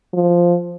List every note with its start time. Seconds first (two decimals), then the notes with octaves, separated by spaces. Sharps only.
0.13 F3